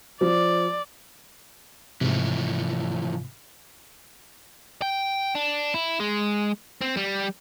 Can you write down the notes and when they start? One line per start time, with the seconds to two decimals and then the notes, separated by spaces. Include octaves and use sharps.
0.21 F3 D5
2.01 G#2 C3 E3 F3 A3
4.82 G5
5.35 D4
5.74 E4
6.00 G#3
6.81 C4
6.97 G3